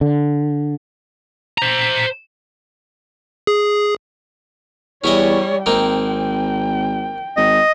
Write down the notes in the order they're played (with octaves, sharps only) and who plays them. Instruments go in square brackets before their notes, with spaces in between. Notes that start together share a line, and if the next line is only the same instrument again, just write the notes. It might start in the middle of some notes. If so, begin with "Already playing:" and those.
[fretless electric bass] D3
[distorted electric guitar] C5 A#5
[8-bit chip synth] G#4
[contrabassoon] E2 [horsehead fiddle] G3 C#5 [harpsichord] C#4 E4 D#5
[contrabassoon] G#1 [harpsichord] A#3 C4 D#4 [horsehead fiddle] G5
[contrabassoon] G#1 [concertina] D#5